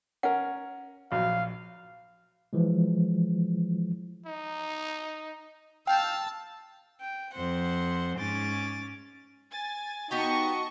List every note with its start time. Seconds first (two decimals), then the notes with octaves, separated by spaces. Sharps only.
0.23 C#4 A#4 F#5
1.12 A#1 F#3 F5
2.53 E3 F3 G#3
4.26 D#4
5.87 F5 G5 A5 E6
7.00 G5
7.33 F2 C4 C5 F#5
8.18 G#2 C#4 D6 A6
9.50 G#5 A6
10.11 B3 D#4 F#4 G4 D#5 G5 A5 C#6